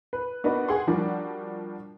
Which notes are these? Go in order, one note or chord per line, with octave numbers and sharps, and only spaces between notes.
B4
B3 D4 D#4 F#4 A#4 B4
G#4 F#5 G5 C6
F3 G3 D4 F#4 A#4